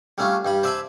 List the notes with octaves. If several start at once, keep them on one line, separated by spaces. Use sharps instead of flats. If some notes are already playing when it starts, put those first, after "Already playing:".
G3 A3 C#4 D4 F4
G2 G3 B5
C5 D5 E5 G#5 A5 B5